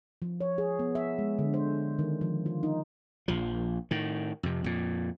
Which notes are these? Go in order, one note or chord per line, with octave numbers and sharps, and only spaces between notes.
F3
C#5
G#4
B3
E5
G#3
D3
C5
D#3
F3
F4
D#4
A#1 F3
A2 D#3
F2 C3
F2 A#2